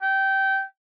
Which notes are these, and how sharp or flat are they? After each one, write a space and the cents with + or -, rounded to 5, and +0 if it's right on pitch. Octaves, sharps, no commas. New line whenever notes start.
G5 -20